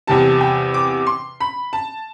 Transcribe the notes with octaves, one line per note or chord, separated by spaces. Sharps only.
E2 C3 G3 A5
G5
D6
C6
B5
A5